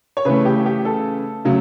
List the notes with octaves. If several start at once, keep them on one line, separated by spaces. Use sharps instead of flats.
C#5
C#3 E3 A3 B4
G4
G4
A4
C#3 F#3 A3